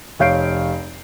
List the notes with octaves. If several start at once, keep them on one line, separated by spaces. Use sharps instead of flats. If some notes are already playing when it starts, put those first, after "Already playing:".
F1 C#5 F5 G6 C7 D7